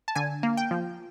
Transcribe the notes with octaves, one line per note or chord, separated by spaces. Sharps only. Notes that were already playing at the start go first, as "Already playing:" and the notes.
A5
D3 G#5
A#3
G5
F3